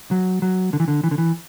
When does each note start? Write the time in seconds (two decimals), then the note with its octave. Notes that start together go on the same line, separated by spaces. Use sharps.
0.11 F#3
0.42 F#3
0.73 D3
0.80 E3
0.88 D3
1.03 E3
1.11 D3
1.18 E3